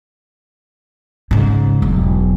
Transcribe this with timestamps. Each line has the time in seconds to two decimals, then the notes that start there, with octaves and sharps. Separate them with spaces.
1.31 G#2 C#3
1.82 E1 F#3